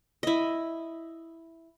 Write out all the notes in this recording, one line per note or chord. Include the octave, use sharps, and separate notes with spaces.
E4 D#5